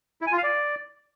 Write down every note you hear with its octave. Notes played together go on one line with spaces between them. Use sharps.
E4
G#5
F4
F5
D5